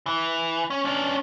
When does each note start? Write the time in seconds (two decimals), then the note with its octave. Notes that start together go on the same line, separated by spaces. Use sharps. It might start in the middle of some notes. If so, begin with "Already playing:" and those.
0.06 E3
0.70 C#4
0.85 C#4 D4